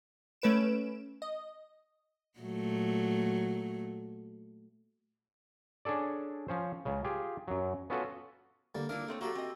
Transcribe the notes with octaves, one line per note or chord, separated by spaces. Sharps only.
A3 C#4 B4 D7 E7
D#5
A#2 F#3 A3
C#4 D4 G#4 A4 D5
F3 C#4 C5
C#2 C#3
F4 G4 G#4
F#2 F#3
B3 C#4 F4 F#4 A4 B4
D3 G3 A#3
A#3 D4 E4 F4 A#4
A3 C4 C#5
F#3 A3 A#3 F#4 G4 A4
C4 D#5